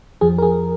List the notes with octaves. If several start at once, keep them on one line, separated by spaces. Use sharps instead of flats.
F2 F3 G#4
A#4
G#4